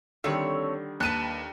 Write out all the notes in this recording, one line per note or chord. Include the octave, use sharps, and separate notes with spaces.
D3 D#3 G3 A3 C4 C#5
D#2 B4 A5 F#6 D#7